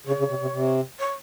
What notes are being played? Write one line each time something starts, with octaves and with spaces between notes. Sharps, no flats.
C#3 C#5
C#3
C3
C3
C3
C#5